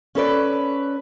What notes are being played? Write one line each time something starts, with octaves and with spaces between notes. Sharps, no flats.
C#4 A4 B4 D5